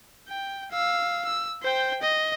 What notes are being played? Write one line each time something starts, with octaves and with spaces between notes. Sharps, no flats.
G5
F5 E6
E6
C5 G5
D#5